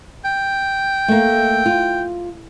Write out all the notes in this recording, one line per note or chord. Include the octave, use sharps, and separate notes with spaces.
G5
A3 A#3
F4